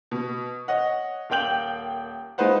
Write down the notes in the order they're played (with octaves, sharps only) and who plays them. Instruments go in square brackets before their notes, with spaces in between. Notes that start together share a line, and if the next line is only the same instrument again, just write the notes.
[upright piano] B2
C#5 D#5 F#5
D#1 A#3 G5 G6 F#7
G#3 D#4 F4 B4 C5 F#5